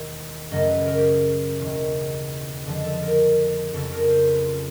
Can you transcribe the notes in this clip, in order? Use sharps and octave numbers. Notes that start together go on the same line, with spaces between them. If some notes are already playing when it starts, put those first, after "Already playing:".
Already playing: E1 D#2 D#3
F#2 C#3 F#3 A3 D#5
B4
A#4
G4
G#4
E1 D#2 C#3
F2 D3 F3 G#3 G#4
A4
A#4
F2 C#3 F#3 A4
A#4
C5
B4
F4